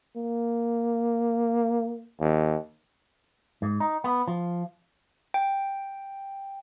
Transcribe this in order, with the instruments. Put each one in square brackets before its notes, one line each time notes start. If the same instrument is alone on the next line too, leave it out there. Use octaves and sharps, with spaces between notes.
[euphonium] A#3
D#2
[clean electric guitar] G#2
D#4
B3
F3
[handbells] G5